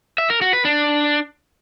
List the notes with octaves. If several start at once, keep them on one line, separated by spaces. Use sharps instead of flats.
E5
A#4
F#4
B4
D4